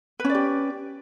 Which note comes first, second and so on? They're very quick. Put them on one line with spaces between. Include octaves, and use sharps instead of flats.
B4 C#4 D5 G4